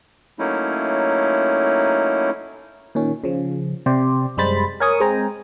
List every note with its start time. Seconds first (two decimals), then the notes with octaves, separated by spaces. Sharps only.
0.39 F#3 A3 A#3 C#4 D#4 E4
2.95 A#2 D#3 C#4
3.24 C#3 F3
3.86 C3 G4 C5 D5
4.37 F#2 G3 G#3 C5 B5 A6
4.80 A#4 C#5 G#5 C#6 D#6
5.00 G#3 C4 G5 G#5 A#5